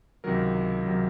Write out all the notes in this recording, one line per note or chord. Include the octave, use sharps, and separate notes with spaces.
C#2 C3 D#3 F#3 A#4
C3 D#3 F#3